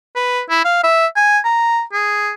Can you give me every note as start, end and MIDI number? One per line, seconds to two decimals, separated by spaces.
0.15 0.42 71
0.49 0.61 64
0.65 0.83 77
0.83 1.06 76
1.16 1.39 80
1.44 1.82 82
1.93 2.32 68